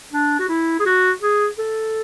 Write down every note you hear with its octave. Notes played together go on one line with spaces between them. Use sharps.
D4
F#4
E4
G#4
F#4
G#4
A4